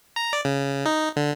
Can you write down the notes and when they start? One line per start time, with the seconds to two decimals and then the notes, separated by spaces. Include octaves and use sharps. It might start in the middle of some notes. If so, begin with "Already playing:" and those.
0.16 A#5
0.33 D5
0.45 C#3
0.85 D#4
1.16 D3